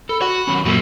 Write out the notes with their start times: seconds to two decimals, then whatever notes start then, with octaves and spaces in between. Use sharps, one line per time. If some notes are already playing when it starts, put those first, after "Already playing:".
0.09 A4 B5
0.22 F#4 F#5
0.47 D#3 F#3 C#4
0.65 F#2 A#2 F#4 A4